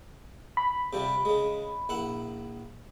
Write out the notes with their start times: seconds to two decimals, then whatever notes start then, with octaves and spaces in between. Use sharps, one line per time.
0.57 B5
0.93 C3 F3 G3
1.25 C#3 G#3
1.89 A#1 E4 F#5